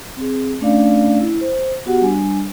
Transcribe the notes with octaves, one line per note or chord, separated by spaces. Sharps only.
C4 G#4
A3 C#4 D4 D5 F5
E4
C5
B3 F#4 G4 F#5
G3 D4 G#5